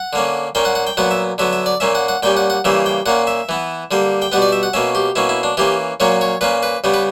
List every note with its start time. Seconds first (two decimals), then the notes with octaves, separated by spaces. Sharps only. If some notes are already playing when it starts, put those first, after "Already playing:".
Already playing: F#5
0.13 D3 A#3 C#4
0.55 A#2 A#3 C#4 G5
0.65 F#5
0.75 F#5
0.87 G5
0.97 A#2 F#3 B3 F#5
1.11 E5
1.38 D3 F#3 B3 E5
1.53 E5
1.66 D5
1.80 A#2 A#3 C#4 E5
1.95 F#5
2.08 F#5
2.23 A#2 G3 C#4 G5
2.37 F#5
2.50 F#5
2.65 C#3 E3 G3 A#3 E5
2.86 G5
3.06 A#2 A#3 C#4 F#5
3.27 E5
3.49 E3 B3
3.91 D3 G3 A#3
4.22 G5
4.32 B2 G3 B3 F#5
4.42 D5
4.52 E5
4.63 F#5
4.73 B2 A#3 C#4 E5
4.95 G4
5.16 B2 A#3 C#4 E4
5.29 E4
5.43 D4
5.57 E3 A#3 C#4 G4
6.00 A#2 F#3 A#3 C#4 C#5
6.21 C#5
6.41 A#2 A#3 C#4 B4
6.63 B4
6.84 C#3 G3 B3
6.94 B4